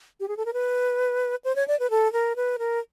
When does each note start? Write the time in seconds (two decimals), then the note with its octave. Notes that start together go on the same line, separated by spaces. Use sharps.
0.20 G4
0.28 G#4
0.37 A4
0.45 A#4
0.53 B4
1.44 C5
1.56 C#5
1.68 D5
1.79 B4
1.90 A4
2.13 A#4
2.36 B4
2.59 A#4